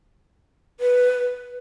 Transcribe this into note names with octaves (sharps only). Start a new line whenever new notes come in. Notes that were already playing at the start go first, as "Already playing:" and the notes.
B4